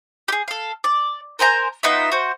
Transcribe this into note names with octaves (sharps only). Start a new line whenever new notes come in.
G4 G#4
A4 F5
D5
A#4 C5 G#5 A#5
B3 D#4 F4 E5
F#4 C5